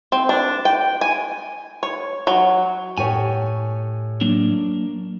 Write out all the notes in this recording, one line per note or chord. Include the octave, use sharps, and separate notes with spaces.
C4
D4
G5
G#5
C#5
F#3
A2 G4 C#5 G#5
F#3 A#3 D4